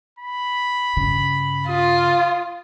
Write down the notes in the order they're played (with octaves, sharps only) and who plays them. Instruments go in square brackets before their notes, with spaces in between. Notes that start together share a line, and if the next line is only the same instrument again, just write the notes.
[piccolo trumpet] B5
[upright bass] G2 C#3
[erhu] F4 [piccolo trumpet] D#6